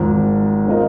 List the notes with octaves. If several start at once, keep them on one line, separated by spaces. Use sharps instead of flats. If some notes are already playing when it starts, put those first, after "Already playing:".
Already playing: G#1 G#2 F3
D#3 C4 F4 A#4 D#5